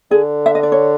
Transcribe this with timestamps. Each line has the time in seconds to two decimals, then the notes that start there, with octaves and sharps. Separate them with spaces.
0.11 D3 G#4
0.46 E5
0.55 D#5
0.63 D5
0.72 C#5